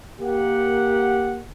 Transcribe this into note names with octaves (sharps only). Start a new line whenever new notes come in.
A#3 G4 F#5